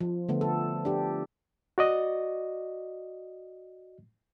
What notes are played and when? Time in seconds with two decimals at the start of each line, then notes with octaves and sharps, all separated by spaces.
0.01 F3
0.29 D3 A3 B3
0.41 A4
0.85 D4 G4
1.78 F#4 D5 D#5